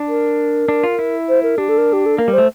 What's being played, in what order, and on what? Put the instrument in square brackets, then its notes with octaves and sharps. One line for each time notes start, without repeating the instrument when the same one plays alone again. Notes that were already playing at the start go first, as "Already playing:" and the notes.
Already playing: [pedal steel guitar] D4
[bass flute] A#4
[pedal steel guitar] D4
F4
E4
[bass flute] C5
A#4
[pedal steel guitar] D4 [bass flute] G4
[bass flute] A4
A#4
G4
A4
[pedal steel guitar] A#3 [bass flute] A#4
[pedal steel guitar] G3
[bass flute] C5
[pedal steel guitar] A3